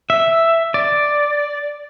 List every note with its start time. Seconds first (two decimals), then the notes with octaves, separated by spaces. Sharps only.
0.10 E5
0.74 D5